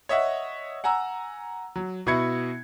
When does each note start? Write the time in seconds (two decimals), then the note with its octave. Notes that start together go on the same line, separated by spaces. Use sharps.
0.09 C#5 D#5 E5 F#5
0.84 F#5 G#5 A#5 E6
1.76 F#3
2.07 B2 E4 B5 G#6 C#7